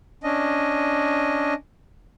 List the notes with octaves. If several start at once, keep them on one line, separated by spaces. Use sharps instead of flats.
C#4 D4 D#5